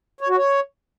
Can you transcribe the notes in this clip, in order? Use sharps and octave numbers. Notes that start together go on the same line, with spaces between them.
C#5
F#4
C#5